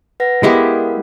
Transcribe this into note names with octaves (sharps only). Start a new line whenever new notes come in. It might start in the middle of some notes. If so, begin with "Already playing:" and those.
B4 F#5 A#6
G#3 B3 E4 G4 A#4 F5